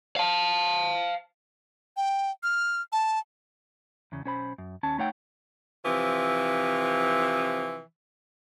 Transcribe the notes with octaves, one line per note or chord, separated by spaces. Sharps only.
F5 A5
G5
F6
A5
E2 C#3
B1 C#4 C5 B5
F#2
D#2 C#4 A5
A3 D#4 C#5 F#5 G5
C3 E3 F3